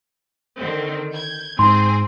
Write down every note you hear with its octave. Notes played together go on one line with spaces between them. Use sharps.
D3 D#3 C4
G6 G#6
G#2 C4 G#4 C6